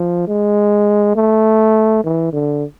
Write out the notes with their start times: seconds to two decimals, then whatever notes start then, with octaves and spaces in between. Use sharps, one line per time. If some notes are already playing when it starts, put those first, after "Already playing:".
Already playing: F3
0.28 G#3
1.16 A3
2.04 E3
2.33 D3